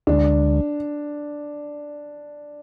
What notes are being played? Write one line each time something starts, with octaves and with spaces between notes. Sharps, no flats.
D2 D3 G#3 D4